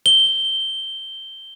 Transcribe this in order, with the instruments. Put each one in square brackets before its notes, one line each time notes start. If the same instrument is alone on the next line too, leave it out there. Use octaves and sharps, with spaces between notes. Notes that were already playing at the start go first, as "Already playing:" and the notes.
[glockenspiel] G7